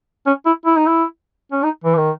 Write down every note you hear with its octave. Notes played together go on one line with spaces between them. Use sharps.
C#4
E4
E4
D#4
E4
C#4
D#4
E3
D#3